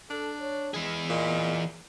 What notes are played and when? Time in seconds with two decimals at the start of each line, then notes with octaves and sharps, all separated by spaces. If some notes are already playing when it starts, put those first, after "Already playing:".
0.10 D4 A4
0.40 C#5
0.74 E3 G#3 G#4
1.10 A#2 D#5